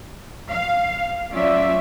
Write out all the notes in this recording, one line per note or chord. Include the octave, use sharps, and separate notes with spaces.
F5
F#3 A3 C#4 F4 D5 E5